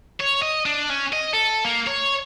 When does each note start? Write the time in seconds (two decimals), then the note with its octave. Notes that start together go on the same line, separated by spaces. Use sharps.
0.20 C#5
0.42 D#5
0.66 D4
0.90 C#4
1.13 D#5
1.33 A4
1.65 A#3
1.87 C#5